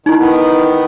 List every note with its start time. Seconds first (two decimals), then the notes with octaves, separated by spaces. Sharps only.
0.06 D#3 D#4 E4
0.19 D#3 B3